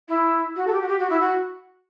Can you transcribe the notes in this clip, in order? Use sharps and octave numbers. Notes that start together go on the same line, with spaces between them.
E4
F#4
A4
G4
F#4
G4
F#4
E4
F#4